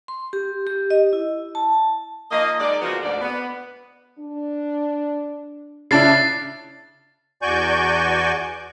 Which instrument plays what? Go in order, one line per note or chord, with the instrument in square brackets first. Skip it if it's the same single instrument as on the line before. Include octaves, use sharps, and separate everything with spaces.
[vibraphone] C6
G4
G4
D#5
E4
A5
[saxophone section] F3 A#3 D#4 D#5
G#3 D#4 G#4 D5
C#3 F3 A#3 B3 F4 F#4
D2 G#2 D5
B3
[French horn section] D4
[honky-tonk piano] C#3 D4 E4 [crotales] A6 C7
[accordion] E2 F#4 D5 G#5 C#6 G6